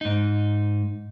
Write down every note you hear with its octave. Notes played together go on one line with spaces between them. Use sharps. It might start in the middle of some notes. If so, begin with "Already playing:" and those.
G#2 D#4